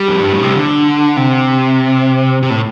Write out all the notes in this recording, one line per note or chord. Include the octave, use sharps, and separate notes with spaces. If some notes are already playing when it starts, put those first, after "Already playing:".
Already playing: G3
F2
G2
A2
C3
D3
C3
C3
A2